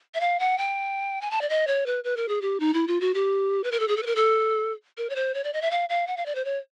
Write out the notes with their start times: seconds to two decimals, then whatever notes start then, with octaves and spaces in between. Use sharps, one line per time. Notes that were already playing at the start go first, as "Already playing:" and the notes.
0.14 E5
0.20 F5
0.39 F#5
0.58 G5
1.21 G#5
1.31 A5
1.41 D5
1.50 D#5
1.67 C#5
1.86 B4
2.04 B4
2.17 A#4
2.29 G#4
2.42 G4
2.60 D#4
2.74 E4
2.88 F4
3.01 F#4
3.14 G4
3.64 B4
3.72 A#4
3.80 A4
3.88 G#4
3.97 A4
4.03 B4
4.06 A#4
4.16 A4
4.98 A#4
5.10 C#5
5.16 C5
5.34 C#5
5.44 D5
5.53 D#5
5.62 E5
5.71 F5
5.89 F5
6.07 F#5
6.17 F5
6.26 D5
6.35 C5
6.45 C#5